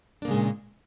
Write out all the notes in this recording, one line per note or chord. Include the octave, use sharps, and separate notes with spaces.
A#2 C#3 G#3 A#3 D4